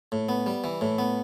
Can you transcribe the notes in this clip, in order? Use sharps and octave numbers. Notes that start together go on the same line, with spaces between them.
A2
B3
G3
E3
A2
B3